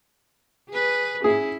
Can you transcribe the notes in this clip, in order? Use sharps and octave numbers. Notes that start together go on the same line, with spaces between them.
G#4 B4
C#4 E4 G#4